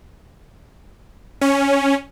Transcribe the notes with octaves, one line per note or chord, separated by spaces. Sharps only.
C#4